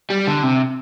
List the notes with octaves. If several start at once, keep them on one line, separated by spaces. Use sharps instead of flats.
G3
D3
C3